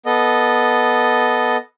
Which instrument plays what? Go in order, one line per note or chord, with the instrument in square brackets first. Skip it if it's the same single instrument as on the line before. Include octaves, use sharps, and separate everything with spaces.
[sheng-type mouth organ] B3 A4 D#5